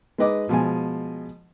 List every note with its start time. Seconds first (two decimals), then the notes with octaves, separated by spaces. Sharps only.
0.18 G#3 D#4 B4 D#5 D6
0.49 B2 F3 G#3 G#5